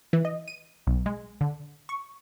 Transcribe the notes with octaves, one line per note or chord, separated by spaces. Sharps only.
E3
D#5
D#7
B1
G#3
D3
C#6